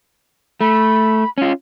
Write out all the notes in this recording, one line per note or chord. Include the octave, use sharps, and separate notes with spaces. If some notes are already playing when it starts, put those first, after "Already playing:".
A3 B5
C#4 F4